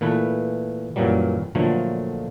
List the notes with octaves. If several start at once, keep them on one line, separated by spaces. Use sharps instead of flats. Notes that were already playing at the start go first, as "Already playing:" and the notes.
A#2 E3 A3 B4
F#2 A#2 E3 F#3 G3
A#2 D3 F3 F#3 A3